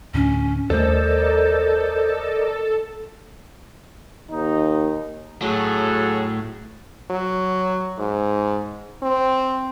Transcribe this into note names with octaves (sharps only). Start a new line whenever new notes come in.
D2 A2 D3 C#4
D#2 G3 A3 A4 A#4 C5 D5 D#5
D#2 D#4
A2 F#3 G#4 A4
F#3
G#2
C4